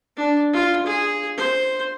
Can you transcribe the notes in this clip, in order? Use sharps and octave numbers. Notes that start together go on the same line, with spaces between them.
D4
F4
G#4
C5